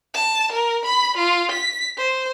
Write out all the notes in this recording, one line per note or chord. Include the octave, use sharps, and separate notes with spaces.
A5
A#4
B5
F4
B6
C5